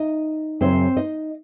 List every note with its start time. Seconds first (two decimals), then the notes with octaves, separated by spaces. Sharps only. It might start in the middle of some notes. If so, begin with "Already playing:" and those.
Already playing: D#4 D#5
0.61 F#2 C#3 F#3 C4 C5
0.96 D#4 D#5